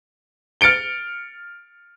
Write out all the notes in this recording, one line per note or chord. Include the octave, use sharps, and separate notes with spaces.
F6 A6 C#7 D7 G7